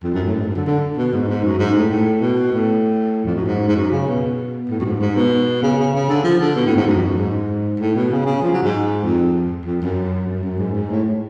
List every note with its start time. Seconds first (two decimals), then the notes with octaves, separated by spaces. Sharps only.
0.03 F2
0.14 F#2
0.25 A2
0.35 G#2
0.45 F#2
0.56 D3
0.66 D3
0.97 B2
1.13 G#2
1.28 G#2
1.44 F#2
1.58 G#2
1.75 A2
1.91 A2
2.21 B2
2.52 A2
3.25 F2
3.35 F#2
3.46 G#2
3.67 G#2
3.76 F#2
3.91 C#3
4.08 B2
4.69 A2
4.80 F#2
4.85 G#2
5.00 G#2
5.16 B2
5.63 C#3
5.78 C#3
5.94 C#3
6.09 D3
6.24 F3
6.40 D3
6.56 B2
6.66 A2
6.76 G#2
6.86 F#2
6.96 F2
7.02 F#2
7.17 G#2
7.80 A2
7.95 B2
8.11 C#3
8.26 C#3
8.42 F3
8.52 F#3
8.62 G#2
9.04 F2
9.65 F2
9.82 F#2
10.28 F#2
10.43 F#2
10.59 G#2
10.74 G#2
10.90 A2